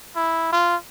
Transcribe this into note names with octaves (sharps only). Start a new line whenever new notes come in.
E4
F4